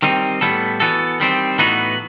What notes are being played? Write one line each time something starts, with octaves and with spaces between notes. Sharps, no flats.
D#3 G3 C4 D#4
A2 G3 B3 E4 A4
E3 B3 F#4 A4
D#3 G3 C4
A2 E3 B3 D#4 F#4